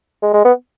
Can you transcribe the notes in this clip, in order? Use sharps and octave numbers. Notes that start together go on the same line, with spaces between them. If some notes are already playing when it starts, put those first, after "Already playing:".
G#3
G#3
B3